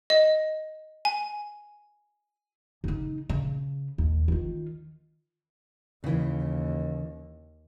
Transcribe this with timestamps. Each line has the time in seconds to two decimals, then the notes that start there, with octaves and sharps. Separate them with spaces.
0.10 D#5
1.05 G#5
2.84 C#3 D#4
3.30 C#3
3.98 D#2
4.28 D#3 F4
6.04 D#2 C#3 E3